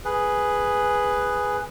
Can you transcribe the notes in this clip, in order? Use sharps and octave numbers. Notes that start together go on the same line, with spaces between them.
G#4 B4